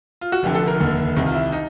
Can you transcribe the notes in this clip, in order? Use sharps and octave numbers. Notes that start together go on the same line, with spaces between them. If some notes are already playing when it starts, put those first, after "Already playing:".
F4
F#4
F1 F2 D3 G4
A4
A#4
F1 D#2 D3
C2 C3 D#3
F4
E4
D#4